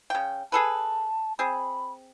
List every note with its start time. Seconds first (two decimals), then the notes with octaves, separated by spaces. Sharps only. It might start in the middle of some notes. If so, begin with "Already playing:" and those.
0.10 C#3 G5
0.52 G#4 A4 B4 A5
1.39 C4 G#4 B5